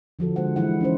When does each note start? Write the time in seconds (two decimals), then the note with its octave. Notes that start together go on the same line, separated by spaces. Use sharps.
0.19 D3 F3 F#4 A4
0.36 D3 G#3 C5 F#5
0.56 E3 G#3 E4 F#5
0.81 C#4 D#4 C5